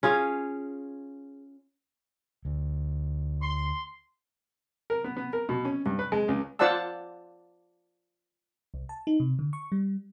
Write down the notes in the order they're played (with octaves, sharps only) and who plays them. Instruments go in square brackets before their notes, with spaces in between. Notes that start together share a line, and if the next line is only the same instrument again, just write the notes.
[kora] C#4 F4 G#4 F5
[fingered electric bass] D2
[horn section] C6
[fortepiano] A#4
B3
B3
A#4
B2
C#4
G2
B4
G#3
C#2
[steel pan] F4 C5 D5 F#5 A5 E6
[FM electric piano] C2
A5
D#4
C3
D3
C#6
G3